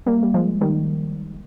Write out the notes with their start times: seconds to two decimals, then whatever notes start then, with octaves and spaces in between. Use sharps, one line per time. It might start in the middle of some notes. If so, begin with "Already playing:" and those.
0.06 G3 A#3
0.23 G3
0.34 F3 G#3
0.61 D#3 G3